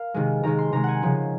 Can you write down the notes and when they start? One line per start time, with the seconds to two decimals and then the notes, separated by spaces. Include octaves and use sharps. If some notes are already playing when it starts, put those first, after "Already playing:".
Already playing: A#4 F5
0.14 C3 D#3 G#3
0.43 C3 D#3 G#3 A#5
0.59 C6
0.72 C3 D#3 G#3 A#5
0.84 F#5 G#5
1.02 C#3 F3 G#3